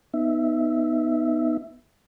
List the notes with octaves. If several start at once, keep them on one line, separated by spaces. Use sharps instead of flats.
B3 D#4 E5